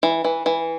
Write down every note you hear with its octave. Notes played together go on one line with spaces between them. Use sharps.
E3
E3
E3